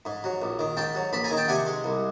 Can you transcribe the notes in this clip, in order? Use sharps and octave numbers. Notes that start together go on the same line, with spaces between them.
G#2
F#3
A#1
D#3
G#2 G5 A5
F#3
A#1 A5 B5
G#5 A#5
D#3
G5 A5
C3 F#5 G#5
G#3
C2